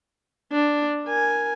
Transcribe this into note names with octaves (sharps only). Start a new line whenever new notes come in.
D4
A#4 G#5